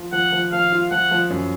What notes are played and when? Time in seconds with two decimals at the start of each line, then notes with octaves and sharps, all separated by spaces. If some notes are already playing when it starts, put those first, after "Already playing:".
Already playing: F3 F4
0.12 F3 F#5
0.32 F3
0.52 F3 F5
0.72 F4
0.91 F3 F#5
1.11 F3
1.30 F#2